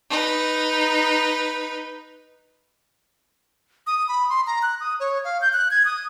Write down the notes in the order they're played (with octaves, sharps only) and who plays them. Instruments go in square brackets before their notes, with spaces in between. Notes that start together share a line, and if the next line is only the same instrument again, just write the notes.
[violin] D#4 B4
[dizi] D#6
B5
C6
A#5
F#6
D#6
C#5
F5
G6
F#6
G#6
D#6